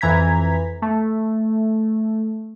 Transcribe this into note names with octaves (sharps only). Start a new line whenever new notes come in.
F2 E3 A#5 G#6 B6
A3